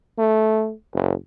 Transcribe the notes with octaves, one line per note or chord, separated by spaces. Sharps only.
A3
F#1